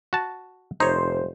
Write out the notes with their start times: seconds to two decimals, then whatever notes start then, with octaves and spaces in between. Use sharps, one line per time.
0.13 F#4 A5
0.80 F1 D#4 C5 C#5